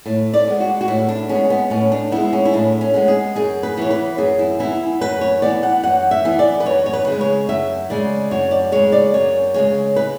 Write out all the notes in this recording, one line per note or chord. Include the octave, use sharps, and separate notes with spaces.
A2
D5
G#3 B3
F#4
F#4
A2 E4
D4
G#3 B3 C#4
B3
A2 C#4
D4
G#3 B3 E4
C#4
E4
A2 D4
C#4
G#3 B3
G#4
F#2 G#4
B4
E3 B3 C#5
B4
F#2 G#4
E4
E3 B3 E4
F#2 B4
C#5
E3 B3 D5
F#5
F#2 F#5
E5
E3 B3
D5
B4
F#2 C#5
C#5
B4
C#3 G#3
C#5
F#2 E5
C#3 G#3 D5
F#2 C#5
D5
C#3 G#3 C#5
D5
F#2 C#5
C#3 G#3 C#5
B4